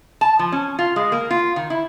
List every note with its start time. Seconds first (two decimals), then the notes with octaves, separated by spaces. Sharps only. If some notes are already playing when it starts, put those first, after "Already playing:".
0.21 A5
0.39 F3
0.52 C#4
0.79 F4
0.96 G#3
1.12 A#3
1.31 F4
1.56 D#3
1.70 E4